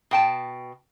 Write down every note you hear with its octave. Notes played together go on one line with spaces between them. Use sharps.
B2 G5 A5